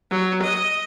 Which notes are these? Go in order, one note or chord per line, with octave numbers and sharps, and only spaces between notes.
F#3
D#5